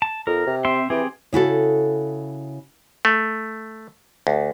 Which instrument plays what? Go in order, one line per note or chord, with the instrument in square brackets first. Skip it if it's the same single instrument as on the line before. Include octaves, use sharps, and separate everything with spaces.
[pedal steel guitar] A5
[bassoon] F2 [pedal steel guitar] A#4
[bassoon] C3
[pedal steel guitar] C4 E5 C6
[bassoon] E3 [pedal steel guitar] C4 G4 G#4
[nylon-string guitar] C#3 E4 F#4 A4
[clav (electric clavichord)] A3
D2